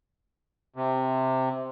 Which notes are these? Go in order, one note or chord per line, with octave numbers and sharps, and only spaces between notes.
C3